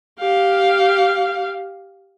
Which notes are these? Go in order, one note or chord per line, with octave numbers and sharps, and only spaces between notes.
G4 F5